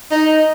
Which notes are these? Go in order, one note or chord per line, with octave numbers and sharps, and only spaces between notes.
D#4